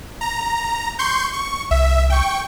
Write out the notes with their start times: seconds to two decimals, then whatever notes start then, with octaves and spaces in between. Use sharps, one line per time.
0.21 A#5
0.99 C6 C#6 G6
1.33 C#6
1.71 C2 E5
2.10 G5 C#6